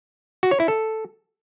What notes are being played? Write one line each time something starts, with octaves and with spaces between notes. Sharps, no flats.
F#4
C#5
E4
A4